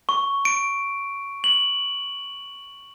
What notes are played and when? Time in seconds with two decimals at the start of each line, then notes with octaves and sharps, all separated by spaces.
0.09 C#6
0.45 D7
1.44 F#7